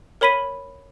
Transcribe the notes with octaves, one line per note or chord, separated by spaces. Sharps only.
A#4 C#5 B5 B6 D#7